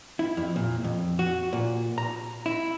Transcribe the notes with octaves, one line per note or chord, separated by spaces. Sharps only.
E4
F2
A#2
F2
F#4
A#2
A#5
E4